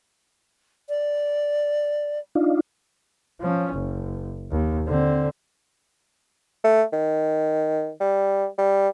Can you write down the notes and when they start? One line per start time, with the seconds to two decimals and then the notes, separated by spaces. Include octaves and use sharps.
0.89 D5
2.35 D4 D#4 F4
3.41 F3 C#4
3.74 F#1
4.51 D#2
4.87 D3 C4
6.64 A3
6.93 D#3
8.00 G3
8.58 G3